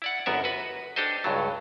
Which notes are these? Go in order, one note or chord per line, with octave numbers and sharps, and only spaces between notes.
E4 D5 F#5
G1 F#2 B3 A#4 E5
F#4 B4
D4 G4 A4 C5 D#5
C#2 G2 F#3